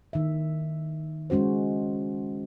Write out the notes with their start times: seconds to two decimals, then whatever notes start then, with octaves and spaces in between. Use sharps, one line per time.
0.13 D#3 E5
1.30 G#3 C#4 F#4 C5